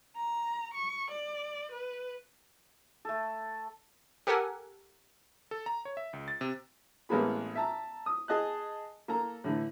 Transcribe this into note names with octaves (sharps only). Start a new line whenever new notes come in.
A#5
C#6
D5
B4
A3 A4
G4 A4 A#4 F#5 G#5
A4
A#5
C#5
E5
C#2
A6
C3
A1 G#3 A#3 B3 G#4 B5
E5 A5 A#5
D#6
G#4 D#5 A5 F#6
A#3 A4 A#5
A2 D3 E3